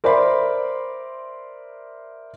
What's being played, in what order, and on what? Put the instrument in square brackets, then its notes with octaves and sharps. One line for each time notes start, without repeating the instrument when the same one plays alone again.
[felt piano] A#4 C5 D5 E5 B5 C6